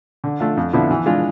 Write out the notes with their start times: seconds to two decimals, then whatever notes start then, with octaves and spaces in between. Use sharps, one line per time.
0.24 D3
0.40 A3 D4 F4
0.57 F2
0.73 D3 F3 B3 E4
0.91 E3
1.06 G#3 D4 F4